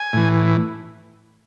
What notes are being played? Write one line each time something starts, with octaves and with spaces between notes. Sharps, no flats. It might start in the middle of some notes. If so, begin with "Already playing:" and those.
Already playing: G#5
A2 E3